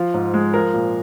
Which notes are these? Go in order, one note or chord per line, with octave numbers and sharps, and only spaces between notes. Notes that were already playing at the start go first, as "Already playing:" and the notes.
Already playing: F3 F4
G#2
G#3
F3 A#4
A#2